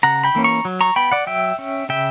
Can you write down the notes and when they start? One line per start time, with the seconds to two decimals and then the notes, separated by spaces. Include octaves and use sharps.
0.03 C#3 F#5 A#5
0.24 G5 B5
0.35 E3 A#3 C#4
0.44 A#5 C#6
0.65 F#3
0.81 A#5 C#6
0.96 B3 G5 B5
1.12 D5 F#5
1.27 F#3 E5 G5
1.59 C#4
1.89 C#3 E5 G5